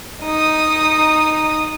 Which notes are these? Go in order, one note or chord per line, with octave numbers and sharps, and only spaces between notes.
D#4 D#6